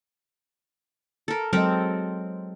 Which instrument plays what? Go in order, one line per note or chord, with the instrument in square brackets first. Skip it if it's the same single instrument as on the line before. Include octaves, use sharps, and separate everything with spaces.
[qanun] A4 A#4
[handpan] F#3 G#3 D#5 [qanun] C4 A4 A#4